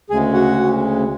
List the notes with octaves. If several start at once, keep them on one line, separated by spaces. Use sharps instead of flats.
D2 C#3 G#3 G#4 G#5
F#4 F#5